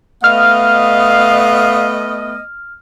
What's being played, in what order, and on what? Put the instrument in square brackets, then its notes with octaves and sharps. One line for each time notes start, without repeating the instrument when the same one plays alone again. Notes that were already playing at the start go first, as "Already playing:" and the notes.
[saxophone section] A3 B3 D#5 [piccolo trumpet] F5 [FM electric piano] F6